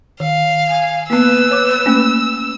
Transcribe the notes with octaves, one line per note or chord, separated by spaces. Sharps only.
D#3 F5
G#5
A#3 B3 B4 E6
C#5 D6
A3 A#3 C#4